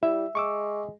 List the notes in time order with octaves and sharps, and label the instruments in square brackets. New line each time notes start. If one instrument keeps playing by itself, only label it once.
[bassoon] G3 [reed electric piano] E4 [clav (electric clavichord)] E5
[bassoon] G#3 [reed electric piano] C#6 D6 E6